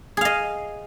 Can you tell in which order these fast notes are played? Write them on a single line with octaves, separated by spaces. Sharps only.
G#4 F5 D#5